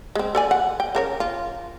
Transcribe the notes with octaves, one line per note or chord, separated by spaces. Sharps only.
G#3 C4
A4 D5 G#5
F#5
G5
C#3 A#4 C#5
F4